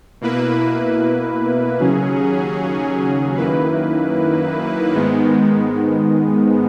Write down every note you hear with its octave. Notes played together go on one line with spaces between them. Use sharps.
B2 A#3 E4 B4
D#2 C#3 F#3 C#4 G#4
F#2 D#3 A#3 E4 B4
G#2 D#3 G#3 B3